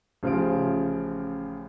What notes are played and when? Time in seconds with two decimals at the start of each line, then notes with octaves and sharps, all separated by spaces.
0.23 A1 C#3 F3 F4 F5 D7